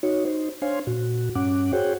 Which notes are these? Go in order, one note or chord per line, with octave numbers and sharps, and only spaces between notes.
D#4 F#4 C#5
D#4 C5
D4 C5 C#5 F5 G#5 C6
A#2 F#4
G2 C#4 F#5 D6
F#4 G#4 C5 C#5 F#5 G5